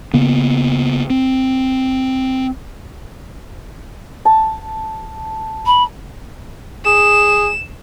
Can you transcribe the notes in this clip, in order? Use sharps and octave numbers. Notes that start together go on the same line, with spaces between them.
C#3 A#3 B3
C4
A5
B5
G#4 E7